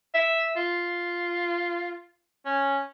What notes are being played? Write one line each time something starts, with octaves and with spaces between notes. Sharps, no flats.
E5
F4
C#4